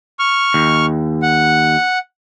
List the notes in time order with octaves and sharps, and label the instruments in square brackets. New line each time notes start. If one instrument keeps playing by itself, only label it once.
[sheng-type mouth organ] C#6 F6
[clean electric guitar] D#2
[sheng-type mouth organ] F#5